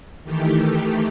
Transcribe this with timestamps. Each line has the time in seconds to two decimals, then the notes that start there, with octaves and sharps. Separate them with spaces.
0.24 D#3 E3 A3 G4